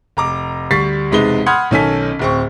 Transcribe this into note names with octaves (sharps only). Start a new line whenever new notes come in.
F1 A#5 D6
D2 G3 C#6 A6 B6 C7
E1 C3 G#3 D#4 B4 G7
F#5 B5 C6 D#6 F6 G#6
B1 D#3 C#4 A4 G#5 B6
D1 C4 C#6